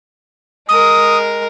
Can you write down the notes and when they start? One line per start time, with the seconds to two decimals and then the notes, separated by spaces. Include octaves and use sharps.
0.69 G#3 A#4 D#6